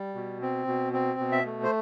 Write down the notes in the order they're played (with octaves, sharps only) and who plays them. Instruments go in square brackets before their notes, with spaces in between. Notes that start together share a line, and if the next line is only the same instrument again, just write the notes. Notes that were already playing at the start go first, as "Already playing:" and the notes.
Already playing: [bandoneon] G3
B2
C4
B2
C4
B2
E5
A3
C5